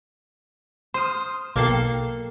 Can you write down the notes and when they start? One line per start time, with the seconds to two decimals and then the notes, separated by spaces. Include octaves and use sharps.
0.94 C5 C6 D#6 F6
1.56 B1 A#3 A4 G5 C7